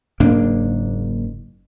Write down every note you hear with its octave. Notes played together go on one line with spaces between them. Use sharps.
F#1 G#2 A#3 D4